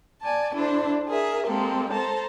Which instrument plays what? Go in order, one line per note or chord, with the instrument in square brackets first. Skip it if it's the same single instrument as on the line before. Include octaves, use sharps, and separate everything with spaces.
[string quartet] D5 G#5 A5
D4 E4 A4 C5
G#4 A#4 E5
G#3 A#3 C4 G4 A4
A4 C5 A5 A#5